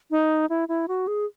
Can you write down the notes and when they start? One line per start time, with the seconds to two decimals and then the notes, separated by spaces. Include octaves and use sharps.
0.11 D#4
0.50 E4
0.68 E4
0.88 F#4
1.07 G#4